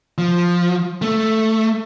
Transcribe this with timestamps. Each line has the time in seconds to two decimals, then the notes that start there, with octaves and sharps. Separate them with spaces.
0.18 F3
1.02 A3